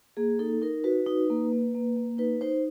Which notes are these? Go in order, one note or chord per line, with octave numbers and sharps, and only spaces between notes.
A#3 G#4
D#4 A4
D#4 A#4
F#4 B4
D#4
A#3
A#3
A#3
A#3
D#4 B4
D#4 C5